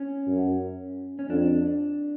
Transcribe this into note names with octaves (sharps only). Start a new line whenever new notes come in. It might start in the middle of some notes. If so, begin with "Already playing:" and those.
Already playing: C#4
F#2
C#4
F2 D4